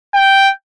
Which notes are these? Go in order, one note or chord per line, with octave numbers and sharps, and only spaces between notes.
G5